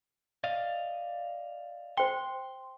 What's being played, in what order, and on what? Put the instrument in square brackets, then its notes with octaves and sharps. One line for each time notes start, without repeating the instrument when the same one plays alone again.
[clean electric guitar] D5 D#5 F5
[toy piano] C5 G5 [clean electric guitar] C6